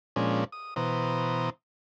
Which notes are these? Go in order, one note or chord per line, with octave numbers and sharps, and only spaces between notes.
A#2 F3 G#3 C#4 D4
D#6
B2 E3 C5 A#5 D#6